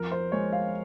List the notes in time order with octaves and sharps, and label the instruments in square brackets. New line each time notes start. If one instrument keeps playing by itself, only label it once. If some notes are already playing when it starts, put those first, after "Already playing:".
Already playing: [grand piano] F2 [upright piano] A#4
[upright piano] C5
[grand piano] G#3 [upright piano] C#5
[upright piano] F5